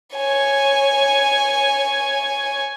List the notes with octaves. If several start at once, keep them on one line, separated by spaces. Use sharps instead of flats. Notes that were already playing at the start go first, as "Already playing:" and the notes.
C#5 G#5